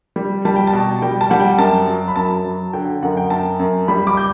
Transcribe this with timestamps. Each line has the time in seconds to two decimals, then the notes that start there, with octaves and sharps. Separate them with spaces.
0.16 G3
0.45 G3 A5
0.56 G5
0.67 A5
0.73 B2
1.02 G3 G5
1.21 A5
1.30 G3 F#5
1.40 G5
1.58 F#2 A5
1.87 F#3
2.08 B5
2.16 F#2 A5
2.45 F#3
2.73 D3 G5
3.02 F#2 F#5
3.17 G5
3.30 F#2 A5
3.59 F#2
3.88 G3 B5
4.07 D6
4.17 G6